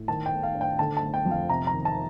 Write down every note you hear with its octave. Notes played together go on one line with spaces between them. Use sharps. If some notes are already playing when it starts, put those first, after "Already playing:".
Already playing: A2
D#3 A5
G5
A3
F5
D4
G5
D3 A5
A5
A3
G5
F2
F5
C3 A#5
A#5
D#3
A5